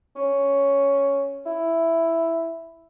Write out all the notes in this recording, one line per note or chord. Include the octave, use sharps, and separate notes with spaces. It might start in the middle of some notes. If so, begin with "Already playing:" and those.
C#4
E4